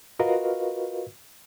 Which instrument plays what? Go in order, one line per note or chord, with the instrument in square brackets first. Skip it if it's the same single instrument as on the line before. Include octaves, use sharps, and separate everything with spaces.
[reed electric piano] F4 F#4 A#4 B4 D#5 F5